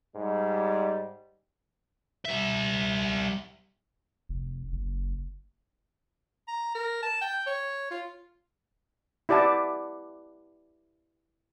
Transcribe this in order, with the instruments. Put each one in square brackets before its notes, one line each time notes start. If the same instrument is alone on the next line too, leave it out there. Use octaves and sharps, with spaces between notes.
[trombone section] G#2 G3
[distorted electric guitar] G3 E5
[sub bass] F1
F#1
[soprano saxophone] A#5
A#4
A5
G5
C#5
F4
[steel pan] E4 G4 D5 F#5 A5